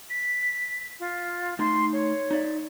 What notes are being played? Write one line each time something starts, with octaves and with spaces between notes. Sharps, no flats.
B6
F4
A3 D#4 C6
C#5
D#4 D5 E5